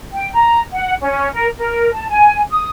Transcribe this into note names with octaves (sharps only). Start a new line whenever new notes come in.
G5
A#5
F#5
C#4
A#4
A#4
A5
G#5
D#6